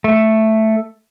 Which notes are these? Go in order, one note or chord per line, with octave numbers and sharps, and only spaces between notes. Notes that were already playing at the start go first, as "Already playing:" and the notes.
A3